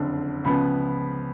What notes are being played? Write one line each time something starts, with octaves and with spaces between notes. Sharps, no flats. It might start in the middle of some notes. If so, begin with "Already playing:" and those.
Already playing: F#1 F2 D3
C#2 C#3 F3 B3 B5